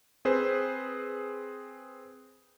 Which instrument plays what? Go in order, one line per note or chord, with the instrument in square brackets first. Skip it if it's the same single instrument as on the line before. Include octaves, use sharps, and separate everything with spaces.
[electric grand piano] C4 G#4 B4 C5